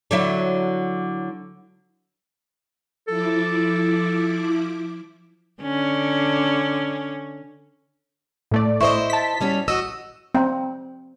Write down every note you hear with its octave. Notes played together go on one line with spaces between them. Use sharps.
D3 F#3 E4
F3 E4 A4 D6
D3 C#4
A2 A3 D5
E4 C5 D#5 E5 C#6
A5 B6
G3 C#4 F#4
F#4 D#5 E6
C4